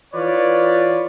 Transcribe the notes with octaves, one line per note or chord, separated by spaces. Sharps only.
E3 F4 B4 C#5 D5